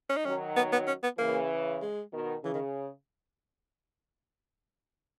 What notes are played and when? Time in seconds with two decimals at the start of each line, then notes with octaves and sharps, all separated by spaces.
0.10 C#4
0.17 D#4
0.25 D#3 F#3 C#4
0.57 B3
0.72 B3
0.87 C#4
1.03 B3
1.18 C#3 E3 A#3
1.82 G#3
2.13 B2 D#3
2.44 C#3 E3
2.54 D#3